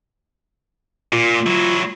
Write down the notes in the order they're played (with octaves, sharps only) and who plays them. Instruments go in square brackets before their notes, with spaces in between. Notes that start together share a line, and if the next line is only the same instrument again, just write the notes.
[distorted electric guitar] A#2 [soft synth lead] F4
[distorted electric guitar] F#3 E4